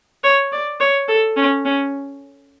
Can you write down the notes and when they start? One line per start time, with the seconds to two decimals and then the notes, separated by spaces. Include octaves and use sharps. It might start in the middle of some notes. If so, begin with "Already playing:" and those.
0.24 C#5
0.53 D5
0.80 C#5
1.08 A4
1.36 C#4
1.65 C#4